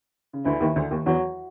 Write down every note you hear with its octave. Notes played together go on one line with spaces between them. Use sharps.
C#3
D2 D3 E3
D#2 D#3
D2 D3
D#2 D#3
E2 E3 F#3